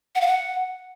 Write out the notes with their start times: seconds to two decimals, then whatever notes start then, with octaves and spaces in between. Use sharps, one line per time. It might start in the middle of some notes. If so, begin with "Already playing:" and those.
0.15 F#5
0.21 F5
0.27 F#5